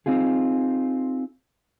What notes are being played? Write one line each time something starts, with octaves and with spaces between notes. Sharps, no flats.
C4 D#4 F4 G#4